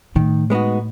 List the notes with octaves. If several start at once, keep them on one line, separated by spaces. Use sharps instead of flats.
A2 D#3
G#3 B3 D#4 F#4